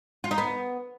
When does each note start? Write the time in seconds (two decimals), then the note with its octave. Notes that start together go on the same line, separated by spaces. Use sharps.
0.24 F4
0.31 D#4
0.38 B3